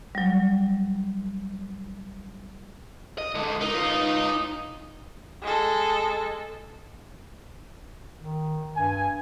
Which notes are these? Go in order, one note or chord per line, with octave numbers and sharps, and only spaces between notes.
F#3 G3
D#5
D3 G#3
D#4 A#4 D#5
F4 B4
G#3 A4
D#3
G2 G#5